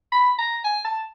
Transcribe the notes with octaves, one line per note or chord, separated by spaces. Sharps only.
B5
A#5
G#5
A5